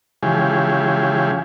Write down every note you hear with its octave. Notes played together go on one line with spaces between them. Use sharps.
C#3 E3 F3 G#3 G4 G#4